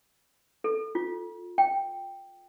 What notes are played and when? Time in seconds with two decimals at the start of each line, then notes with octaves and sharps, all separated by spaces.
0.64 A4
0.95 F4
1.58 G5